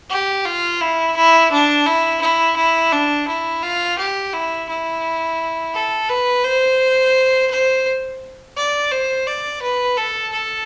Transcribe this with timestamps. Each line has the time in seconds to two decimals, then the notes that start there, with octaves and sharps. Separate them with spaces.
0.10 G4
0.45 F4
0.81 E4
1.16 E4
1.51 D4
1.86 E4
2.21 E4
2.57 E4
2.93 D4
3.28 E4
3.63 F4
3.98 G4
4.33 E4
4.69 E4
5.74 A4
6.09 B4
6.44 C5
7.50 C5
8.57 D5
8.92 C5
9.27 D5
9.62 B4
9.97 A4
10.32 A4